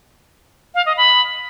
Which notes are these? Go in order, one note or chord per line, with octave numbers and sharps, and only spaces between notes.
F5
D#5
B5